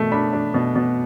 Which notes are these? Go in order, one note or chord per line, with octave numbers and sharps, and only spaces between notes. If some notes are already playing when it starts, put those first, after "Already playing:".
Already playing: B2 A3
D4 B5
D4
B2
B2